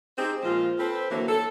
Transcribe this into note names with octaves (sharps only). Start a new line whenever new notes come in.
C4 D#4 G4 G#4 C5
A#2 F3 G#3 F4 C5
C4 A4 B4 C5
D3 E3 F#3 A#3
A4